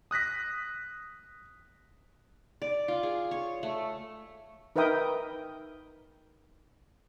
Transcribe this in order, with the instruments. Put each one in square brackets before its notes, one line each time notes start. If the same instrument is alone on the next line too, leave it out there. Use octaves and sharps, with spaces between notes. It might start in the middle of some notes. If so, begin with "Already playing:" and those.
[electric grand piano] D#6 F#6 A#6 B6
[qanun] D5
F4
G#4
C#5
A3
[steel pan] D#4 A#4 B4 E5 G5 D#6